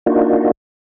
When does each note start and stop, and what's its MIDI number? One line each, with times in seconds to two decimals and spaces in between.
0.06 0.51 58
0.06 0.51 62
0.06 0.51 63
0.06 0.51 65
0.06 0.51 66